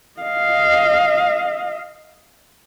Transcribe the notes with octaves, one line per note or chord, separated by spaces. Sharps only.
D#5 F5